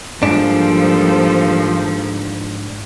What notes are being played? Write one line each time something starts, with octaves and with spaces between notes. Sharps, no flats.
G#2 F3 G3 A#3 D4 A4